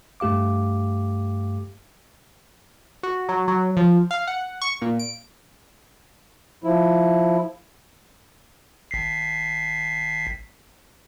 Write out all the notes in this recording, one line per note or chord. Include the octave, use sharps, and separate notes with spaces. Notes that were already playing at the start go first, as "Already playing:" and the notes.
G2 A3 G4 F5 D6
F#4
F#3
F#3
F3
F5
F#5
C#6
A#2
D7
F3 E4
G#1 B6 C7